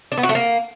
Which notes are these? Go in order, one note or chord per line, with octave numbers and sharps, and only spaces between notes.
D4
B3
F#4
A3
A#3